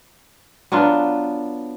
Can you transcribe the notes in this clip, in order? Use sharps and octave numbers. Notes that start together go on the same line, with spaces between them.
F#3 B3 D4 F4